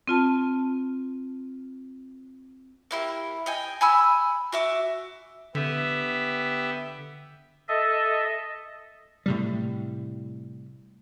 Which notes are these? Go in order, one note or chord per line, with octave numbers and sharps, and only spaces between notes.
C4 F4 A5
A#3 E4 G4
D#5 G5 G#5
G#5 B5 E6
F#4 E5 D6
D3 B3 G4 E5
A4 D#5 E5
A2 C3 G3